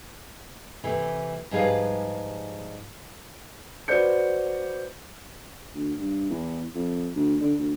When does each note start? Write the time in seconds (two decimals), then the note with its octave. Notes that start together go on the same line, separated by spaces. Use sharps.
0.84 C3 E3 A3
1.51 G#2 F3 G3 G#4 B4 F5
3.88 F#4 B4 C5 D5 G6 C#7
5.75 D2
5.98 G2
6.30 E2
6.75 F2
7.16 D2
7.41 D3
7.59 D2